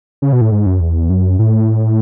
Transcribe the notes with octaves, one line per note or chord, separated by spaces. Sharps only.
C#3
B2
A2
G#2
F#2
E2
F#2
A2